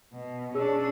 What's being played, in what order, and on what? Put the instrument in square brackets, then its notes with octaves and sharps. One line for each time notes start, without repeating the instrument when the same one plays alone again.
[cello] B2
[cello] C#4 D4 [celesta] G#4 C#5 E6